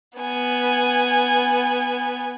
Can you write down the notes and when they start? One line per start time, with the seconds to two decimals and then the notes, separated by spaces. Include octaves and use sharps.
0.19 B3 G#5